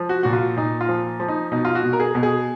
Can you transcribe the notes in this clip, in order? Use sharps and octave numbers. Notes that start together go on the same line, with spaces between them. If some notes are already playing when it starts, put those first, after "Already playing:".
Already playing: F3
F#4
A#2 F#4
F4
A#2 D#4
F4
F3
F3
D#4
B2 D#4
F4
F#4
B2
A#4
G#4
B2
G#4